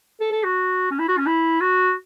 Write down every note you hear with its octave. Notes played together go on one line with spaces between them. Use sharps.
A4
A4
F#4
C#4
E4
F#4
C#4
E4
F#4